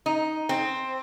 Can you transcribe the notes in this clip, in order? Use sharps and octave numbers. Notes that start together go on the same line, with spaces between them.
D#4
C4